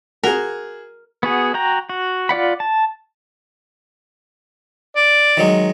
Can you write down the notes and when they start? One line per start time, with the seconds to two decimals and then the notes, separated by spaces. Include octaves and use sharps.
0.24 F#4 G#4 A#4
1.23 B3 F#4 G#4
1.54 F#4 G5 A#5
1.89 F#4
2.29 F4 D5 F#5 B5
2.60 A5
4.96 D5
5.37 D#3 F#3 G#3